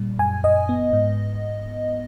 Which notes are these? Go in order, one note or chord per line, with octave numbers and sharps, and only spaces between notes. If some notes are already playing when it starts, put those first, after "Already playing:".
Already playing: A#2 G3
F#2 G#5
F#2 D#5
B3
G#2